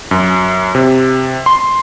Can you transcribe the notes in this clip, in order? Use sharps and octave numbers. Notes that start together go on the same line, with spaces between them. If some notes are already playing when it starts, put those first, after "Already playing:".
F#2
C3
C6